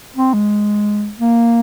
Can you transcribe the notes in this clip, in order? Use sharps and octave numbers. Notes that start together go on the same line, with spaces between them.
C4
G#3
A#3